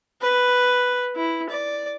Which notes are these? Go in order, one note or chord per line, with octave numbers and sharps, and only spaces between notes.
B4
E4
D5